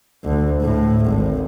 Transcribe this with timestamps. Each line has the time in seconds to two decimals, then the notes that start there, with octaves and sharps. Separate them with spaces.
0.24 D2
0.62 A2
1.05 G#1